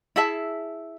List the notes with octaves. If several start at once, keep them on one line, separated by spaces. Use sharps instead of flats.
E4 G#4 E5 A5